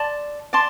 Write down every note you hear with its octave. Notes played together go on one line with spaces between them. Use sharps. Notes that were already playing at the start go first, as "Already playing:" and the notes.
Already playing: D5 A5 C6
D5 A5 C6